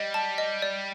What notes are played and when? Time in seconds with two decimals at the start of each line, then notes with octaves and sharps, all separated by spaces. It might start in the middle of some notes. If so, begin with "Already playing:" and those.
Already playing: G3 D#5
0.14 A5
0.38 D#5
0.62 D5